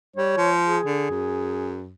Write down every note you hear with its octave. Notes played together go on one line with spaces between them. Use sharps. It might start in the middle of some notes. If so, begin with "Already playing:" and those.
G3 C#5
F3
G#4
D3
F#2